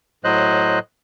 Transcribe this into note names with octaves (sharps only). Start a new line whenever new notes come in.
A2 F#3 C5 D#5 F#6